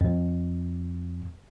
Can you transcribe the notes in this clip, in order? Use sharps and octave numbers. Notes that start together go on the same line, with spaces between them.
F2